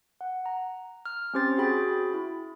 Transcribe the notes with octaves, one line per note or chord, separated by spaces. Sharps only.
F#5
A#5
F6
C4 C#4 G4 C5 C6 A6
F#4 G#4 G5 B5 A6
E4